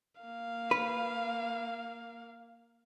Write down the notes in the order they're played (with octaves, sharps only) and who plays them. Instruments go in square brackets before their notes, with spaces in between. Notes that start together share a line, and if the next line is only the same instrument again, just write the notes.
[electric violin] A#3 F5
[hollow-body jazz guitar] B4